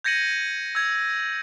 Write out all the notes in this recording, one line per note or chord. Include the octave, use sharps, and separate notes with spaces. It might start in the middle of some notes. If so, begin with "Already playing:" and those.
G6 G#6 A#6 C#7 D#7 F#7
E6 G#6